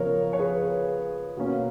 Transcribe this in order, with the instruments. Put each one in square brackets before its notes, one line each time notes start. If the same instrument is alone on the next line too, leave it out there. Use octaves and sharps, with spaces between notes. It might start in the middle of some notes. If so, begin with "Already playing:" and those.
Already playing: [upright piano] C#3 F3 B3 F4 [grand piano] A#4 C#5
[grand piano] C#5
G#4 B4
[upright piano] B2 A#3 C#4